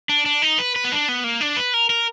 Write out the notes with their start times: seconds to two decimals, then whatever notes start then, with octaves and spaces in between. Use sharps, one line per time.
0.09 D4
0.26 D4
0.42 D#4
0.59 B4
0.76 B4
0.85 B3
0.92 D4
1.09 B3
1.24 A#3
1.41 D4
1.57 B4
1.74 A#4
1.90 A#4